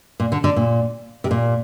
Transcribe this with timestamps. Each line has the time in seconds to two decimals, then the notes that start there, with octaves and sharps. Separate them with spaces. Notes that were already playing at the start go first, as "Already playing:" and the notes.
0.20 A#2
0.32 D3
0.44 D3
0.56 A#2
1.24 C3
1.31 A#2